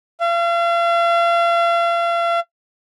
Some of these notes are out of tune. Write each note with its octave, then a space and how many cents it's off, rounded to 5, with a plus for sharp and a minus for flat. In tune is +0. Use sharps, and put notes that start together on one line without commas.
F5 -40